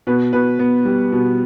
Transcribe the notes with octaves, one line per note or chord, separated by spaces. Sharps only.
B2 B4
B2 B4
B3
G3
B2